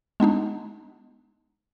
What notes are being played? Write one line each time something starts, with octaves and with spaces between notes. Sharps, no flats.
G#3 B3 D4 D#4